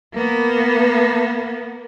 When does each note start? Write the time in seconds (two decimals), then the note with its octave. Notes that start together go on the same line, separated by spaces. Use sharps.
0.14 A#3 B3